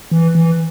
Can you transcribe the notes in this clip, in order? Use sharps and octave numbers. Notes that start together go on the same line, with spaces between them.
E3
E3